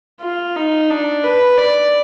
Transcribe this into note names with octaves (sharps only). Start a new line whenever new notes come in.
F4
D#4
D4
B4
D5